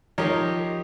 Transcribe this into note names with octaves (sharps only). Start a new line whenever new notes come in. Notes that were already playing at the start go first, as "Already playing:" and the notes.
F3 D#4 G4 A#4 C#5